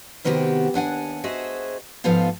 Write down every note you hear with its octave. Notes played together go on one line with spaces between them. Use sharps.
C3 D#3 B3 C4 F#4 G4
D#2 D4 F#5 G#5
F#4 G#4 C5 D#5 E5
G#2 F3 B3 F4 A4 F5